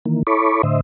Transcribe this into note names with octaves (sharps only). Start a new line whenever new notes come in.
D#3 E3 A#3
E4 A4 C#5 B5 C#6 D6
A2 D3 C5 D#5 E5